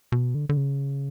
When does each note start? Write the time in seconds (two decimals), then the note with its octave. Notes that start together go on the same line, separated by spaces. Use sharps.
0.12 B2
0.35 D3
0.49 D3
0.57 C#3